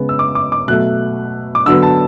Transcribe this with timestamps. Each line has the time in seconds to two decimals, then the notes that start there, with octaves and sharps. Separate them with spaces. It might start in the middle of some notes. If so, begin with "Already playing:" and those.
Already playing: C#3 G#3 B3
0.09 E6
0.19 D6
0.35 D6
0.52 D6
0.68 B2 F#3 A3 F#6
1.55 D6
1.66 D3 F#3 B3 E6
1.83 A5